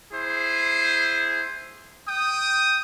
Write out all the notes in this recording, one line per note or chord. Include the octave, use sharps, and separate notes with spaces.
E4 G#4 C5
G5 D#6